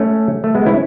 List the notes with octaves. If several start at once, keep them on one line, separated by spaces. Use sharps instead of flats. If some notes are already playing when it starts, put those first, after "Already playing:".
Already playing: A3 C#4
A3
G#3 B3
C#4 E4